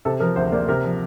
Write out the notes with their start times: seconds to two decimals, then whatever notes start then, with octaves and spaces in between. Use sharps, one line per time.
0.05 C3 A4
0.20 F3 A#4
0.36 D2 C5
0.52 A#3 D5
0.68 C3 A#4
0.84 F3